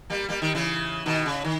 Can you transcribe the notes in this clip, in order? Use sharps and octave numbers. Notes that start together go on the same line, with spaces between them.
G3 A#3
G3 A#3
D#3 G3
C#3 E3
B2 D#3
C#3
D#3